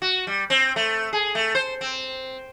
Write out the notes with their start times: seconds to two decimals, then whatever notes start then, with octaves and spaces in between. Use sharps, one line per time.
0.02 F#4
0.27 G3
0.50 C4
0.76 A3
1.13 G#4
1.35 A3
1.55 C5
1.81 C4